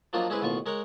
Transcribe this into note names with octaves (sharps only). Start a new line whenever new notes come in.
F3 F#3 A#3 D4 D#4 F4
G#3 C4 C#4 E4 G#4 B4
A1 D#2 B2 F4 C#6
G#3 A#4 C#5 F#5